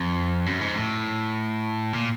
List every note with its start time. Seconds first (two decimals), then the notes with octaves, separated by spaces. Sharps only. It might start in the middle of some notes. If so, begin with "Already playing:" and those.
Already playing: F2
0.46 F#2
0.61 G#2
0.76 A2
1.93 A#2